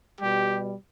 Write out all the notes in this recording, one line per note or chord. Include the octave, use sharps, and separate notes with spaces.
B2 G3 G4